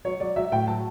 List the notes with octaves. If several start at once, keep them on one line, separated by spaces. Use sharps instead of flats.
F#3 C#5
F#3 D5
F#3 E5
A2 G5
F#3 A5